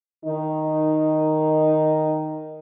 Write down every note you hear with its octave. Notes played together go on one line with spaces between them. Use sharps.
D#3 D#4